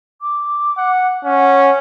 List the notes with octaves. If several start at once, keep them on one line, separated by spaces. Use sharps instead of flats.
D6
F#5
C#4 F#5